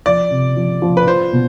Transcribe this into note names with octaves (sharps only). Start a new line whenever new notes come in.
F3 D5
C3
F3
F3
B4
F4 C5
B2